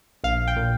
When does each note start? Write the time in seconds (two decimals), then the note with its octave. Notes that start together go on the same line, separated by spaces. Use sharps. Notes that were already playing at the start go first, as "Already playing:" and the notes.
0.24 A#1 F5
0.47 G5
0.56 A#2